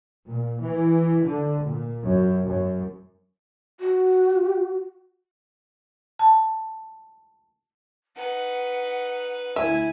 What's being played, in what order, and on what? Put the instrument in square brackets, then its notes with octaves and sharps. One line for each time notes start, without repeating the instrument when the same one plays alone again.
[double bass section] A#2
E3
D3
A#2
F#2
F#2
[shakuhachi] F#4
[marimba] A5
[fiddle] D#4 B4 [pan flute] F#5
[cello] D2 E4 [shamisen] E5 [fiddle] G#5